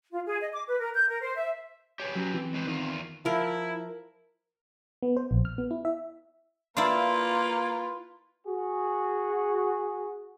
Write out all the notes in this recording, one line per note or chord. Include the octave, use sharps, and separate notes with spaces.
F4
G#4
D#5
D6
B4
A#4
G6
A#4
C5
E5
E3 G4 G#4 B4 C#5
F#3 C#4 F#4
E3 C4 G5
G#3 B4 C5
E2 D#3 F4
F3 E4 A#4
B3
C5
A#1
F6
B3
E4
E5
A#3 E4 F4 B4 D5 F5 C6
F#4 G#4